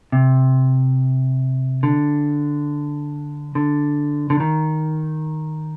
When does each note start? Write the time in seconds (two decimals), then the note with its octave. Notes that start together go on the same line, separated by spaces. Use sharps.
0.12 C3
1.83 D3
3.55 D3
4.30 D3
4.40 D#3